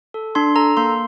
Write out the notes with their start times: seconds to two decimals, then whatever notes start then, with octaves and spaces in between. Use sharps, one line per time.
0.14 A4
0.35 D4 C6
0.56 A4 A#5
0.77 A#3 C6